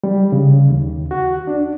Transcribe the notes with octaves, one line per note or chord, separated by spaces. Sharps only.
G3
C#3
D#2
F#4
D4